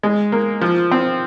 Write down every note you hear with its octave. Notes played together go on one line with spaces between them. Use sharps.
G#3
A#3
F3
C4